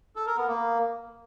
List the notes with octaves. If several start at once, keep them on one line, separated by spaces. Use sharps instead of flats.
A4
A#4
B3
A#3